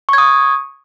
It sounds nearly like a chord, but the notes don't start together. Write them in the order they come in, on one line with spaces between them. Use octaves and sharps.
C#6 G#6 D#6